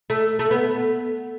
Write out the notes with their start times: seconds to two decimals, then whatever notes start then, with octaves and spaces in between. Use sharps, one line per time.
0.10 A3
0.39 A3
0.51 B3